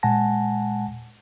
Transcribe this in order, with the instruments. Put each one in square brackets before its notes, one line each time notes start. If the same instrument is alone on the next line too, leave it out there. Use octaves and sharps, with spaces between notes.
[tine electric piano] A#2 G#3 F#5 G#5 A5 A#6